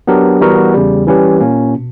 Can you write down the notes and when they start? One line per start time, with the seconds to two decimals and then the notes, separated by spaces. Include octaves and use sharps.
0.07 F#3 B3 D4 G4 A#4
0.41 E3 G3 B3 F#4 A#4
0.74 E2 C#3 G3
1.07 E3 G3 C#4 G4 B4
1.40 A#2 A#3 C#4
1.76 B2